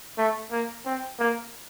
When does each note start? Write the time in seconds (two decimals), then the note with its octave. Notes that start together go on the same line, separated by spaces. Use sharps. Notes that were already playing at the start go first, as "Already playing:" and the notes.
0.18 A3
0.51 A#3
0.86 C4
1.19 A#3